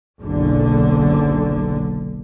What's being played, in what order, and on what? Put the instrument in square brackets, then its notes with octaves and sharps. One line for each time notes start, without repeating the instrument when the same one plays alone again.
[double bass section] F#1 B1 D3